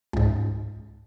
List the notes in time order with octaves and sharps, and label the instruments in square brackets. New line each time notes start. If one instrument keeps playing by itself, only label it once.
[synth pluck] C#2 G#2